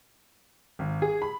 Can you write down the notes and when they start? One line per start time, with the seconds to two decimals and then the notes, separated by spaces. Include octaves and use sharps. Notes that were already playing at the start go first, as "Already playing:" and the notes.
0.79 G#1
1.02 G#4
1.22 B5